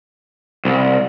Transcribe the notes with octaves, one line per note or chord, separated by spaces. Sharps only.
C2